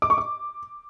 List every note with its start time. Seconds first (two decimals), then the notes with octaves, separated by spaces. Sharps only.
0.02 D6
0.10 C#6
0.18 D6